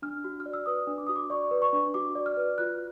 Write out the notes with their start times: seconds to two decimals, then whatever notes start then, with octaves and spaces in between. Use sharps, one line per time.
0.02 D4 F6
0.24 F#4
0.40 F6
0.46 D5
0.53 E6
0.66 B4 D#6
0.87 D4
0.98 D6
1.07 F#4 D#6
1.16 D6
1.30 D5 C#6
1.51 B4
1.62 C#6
1.73 D4
1.94 F#4 D6
2.15 D5
2.26 F6
2.37 B4
2.58 F4 F#6